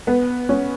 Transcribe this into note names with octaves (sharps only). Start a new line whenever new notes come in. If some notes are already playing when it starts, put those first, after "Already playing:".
B3
C#4